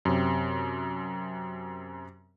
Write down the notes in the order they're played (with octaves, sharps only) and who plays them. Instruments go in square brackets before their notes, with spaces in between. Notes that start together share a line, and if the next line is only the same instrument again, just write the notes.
[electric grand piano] F#2 C3